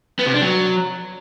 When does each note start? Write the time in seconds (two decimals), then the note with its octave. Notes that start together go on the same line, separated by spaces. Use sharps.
0.19 B3
0.26 C3
0.34 D4
0.42 F#3